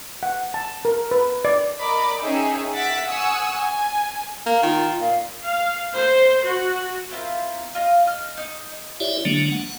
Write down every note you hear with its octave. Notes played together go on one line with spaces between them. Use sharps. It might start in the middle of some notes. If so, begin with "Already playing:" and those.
F#5
A5
A#4
B4
D5
A#4 D5 D#5 A#5 B5 D6
C#4 D#4 G#4 C#5 E5 G5
E5 F#5 A6 B6 D7
F#5 G#5 C#6 D#6 E6
G#5
A#3
D#3 F4
A#2 F5
F5
C5
F#4
C4 E4 F4 A#4
F4 D#5
D#5 F6
D#4 D#6 G6
E4 G4 C#5 D5 E5
D3 F#3 G#3 A#3 D4
F#5